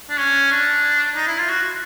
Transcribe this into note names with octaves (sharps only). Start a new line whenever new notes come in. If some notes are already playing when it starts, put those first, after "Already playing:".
D4
C#4
D4
D#4
E4
F4
F#4